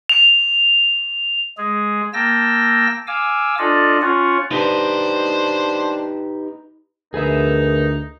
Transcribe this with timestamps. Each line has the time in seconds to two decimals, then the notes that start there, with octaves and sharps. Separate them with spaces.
0.09 F7
1.58 G#3 G#4
2.14 A#3 G5 A5 E6 A#6
3.07 F5 G#5 D6 E6
3.59 D4 F4 A4 D5 D#5
4.02 C#4 F4 C#5 F#5
4.51 D4 D#4 G4 B4 C5
7.14 D2 D#4 G#4 A#4 B4 E5